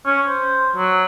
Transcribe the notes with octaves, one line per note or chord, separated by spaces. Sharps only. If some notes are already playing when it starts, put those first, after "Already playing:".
C#4
C5
F#3